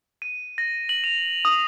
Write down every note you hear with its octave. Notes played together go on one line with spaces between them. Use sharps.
D#7
A#6
F#7
F7
D#6